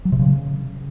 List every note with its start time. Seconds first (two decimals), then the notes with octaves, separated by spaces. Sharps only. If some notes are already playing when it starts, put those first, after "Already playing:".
0.05 F#3
0.12 C3
0.19 C#3